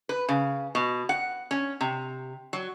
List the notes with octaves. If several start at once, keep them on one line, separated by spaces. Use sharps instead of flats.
B4
C#3
B2
F#5
C#4
C3
F#3